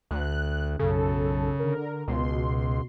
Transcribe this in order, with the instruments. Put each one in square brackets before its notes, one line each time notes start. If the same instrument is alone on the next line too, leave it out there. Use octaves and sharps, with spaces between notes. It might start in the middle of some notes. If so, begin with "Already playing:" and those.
[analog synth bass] D2 [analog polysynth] F#6
[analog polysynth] B1 F#2 A4 [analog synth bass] C#3
[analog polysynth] D3 A#4
[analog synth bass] C#2 [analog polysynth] B2 C6